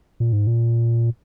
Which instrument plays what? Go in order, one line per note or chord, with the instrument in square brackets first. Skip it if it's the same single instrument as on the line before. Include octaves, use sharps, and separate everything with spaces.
[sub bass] A#2
G#2
A#2